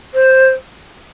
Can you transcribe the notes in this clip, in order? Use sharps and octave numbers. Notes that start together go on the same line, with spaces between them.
C5